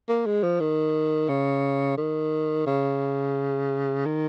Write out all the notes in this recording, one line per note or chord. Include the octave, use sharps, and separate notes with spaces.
A#3
G#3
F3
D#3
C#3
D#3
C#3
D#3